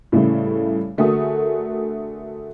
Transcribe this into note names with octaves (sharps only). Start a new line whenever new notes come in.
A2 C#3 E3 G3 A3
D3 A3 F#4 G#4 A#4 D#6